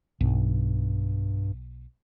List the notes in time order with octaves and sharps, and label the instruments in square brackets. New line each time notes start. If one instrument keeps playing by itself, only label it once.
[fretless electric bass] B1 [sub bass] G2